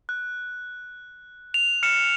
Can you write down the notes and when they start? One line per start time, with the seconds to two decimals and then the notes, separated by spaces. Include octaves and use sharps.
0.09 F#6
1.54 F7
1.83 F6 C#7 E7